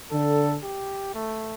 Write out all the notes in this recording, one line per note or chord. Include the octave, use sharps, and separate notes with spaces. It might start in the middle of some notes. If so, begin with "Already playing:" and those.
D3 A4
G4
A3